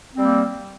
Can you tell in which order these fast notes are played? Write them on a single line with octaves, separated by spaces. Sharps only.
C4 G3 A#3